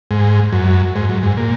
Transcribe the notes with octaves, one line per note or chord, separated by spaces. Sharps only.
G#2
F#2
G#2
F#2
G#2
A#2